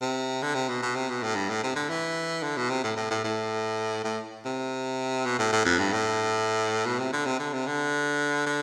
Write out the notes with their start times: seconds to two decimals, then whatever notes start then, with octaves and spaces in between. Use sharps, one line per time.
0.02 C3
0.42 D3
0.55 C3
0.69 B2
0.82 B2
0.96 C3
1.10 B2
1.23 A2
1.35 G2
1.49 A2
1.63 C3
1.76 D3
1.90 E3
2.43 D3
2.57 B2
2.70 C3
2.84 A2
2.97 A2
3.11 A2
3.24 A2
4.04 A2
4.45 C3
5.25 B2
5.39 A2
5.52 A2
5.65 F2
5.79 G2
5.93 A2
6.86 B2
6.99 C3
7.13 D3
7.26 C3
7.39 D3
7.53 C3
7.67 D3
8.46 D3